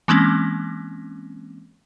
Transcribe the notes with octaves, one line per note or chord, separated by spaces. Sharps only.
E3 G#3 A#3 C4 C#4